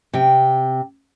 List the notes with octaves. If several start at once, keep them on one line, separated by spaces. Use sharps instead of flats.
C3 G5